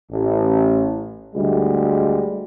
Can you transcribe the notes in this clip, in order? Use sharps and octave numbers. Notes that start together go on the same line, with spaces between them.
A1
D2 G3 G#3